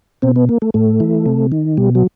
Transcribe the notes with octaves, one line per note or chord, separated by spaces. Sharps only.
B2 C4
B3
A#3
A3
A2 A3
E3
C3
D#3
B2 G3
F#3